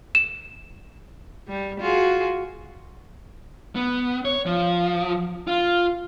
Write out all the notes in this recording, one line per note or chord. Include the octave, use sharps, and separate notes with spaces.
E7
G3
F4 F#4 G#4
B3
C#5
F3
F4